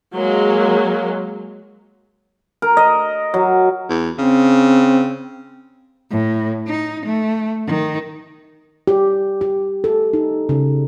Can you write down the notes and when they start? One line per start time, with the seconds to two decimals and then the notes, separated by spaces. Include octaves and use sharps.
0.14 F#3 G#3 A#3
2.62 A#4
2.77 D#5
3.34 F#3
3.90 E2
4.19 C#3 C4
6.10 A2
6.67 D#4
7.06 A3
7.67 D#3
8.88 G4
9.41 G4
9.84 A4
10.13 D#4
10.49 C#3